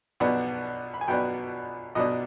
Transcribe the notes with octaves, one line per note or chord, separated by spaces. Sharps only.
B1 B2 B3 D4
B5
G#5
B1 B2 B3 D4 G5
B1 B2 B3 D4 D#5